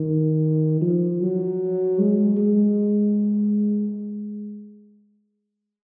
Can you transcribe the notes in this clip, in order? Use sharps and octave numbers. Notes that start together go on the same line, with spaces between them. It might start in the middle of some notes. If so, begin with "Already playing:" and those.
Already playing: D#3
F3
F#3
G#3
G#3